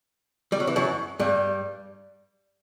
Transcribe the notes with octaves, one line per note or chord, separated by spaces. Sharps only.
G3
F#3
E3
F#2 F#3
G2 G3